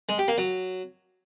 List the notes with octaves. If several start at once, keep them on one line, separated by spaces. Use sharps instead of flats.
G#3
G4
A#3
F#3